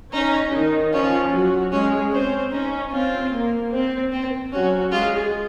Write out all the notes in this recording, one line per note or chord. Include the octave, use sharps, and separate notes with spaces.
C#4 D#4
D#3 D#4
F3 C#4 F4
F#3 F#4
G#3 C#4 G#4
C4 C#4 C5
C#4 D#4
C4 F4
A#3
C4
C4
F#3 C#4 F#4
G#3 F4 G#4